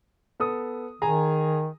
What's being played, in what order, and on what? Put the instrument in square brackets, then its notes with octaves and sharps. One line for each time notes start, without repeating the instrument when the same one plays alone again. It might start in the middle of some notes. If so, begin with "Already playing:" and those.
[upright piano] B3 A4 D#6
[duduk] D#3 [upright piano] G#4 G#5 A#5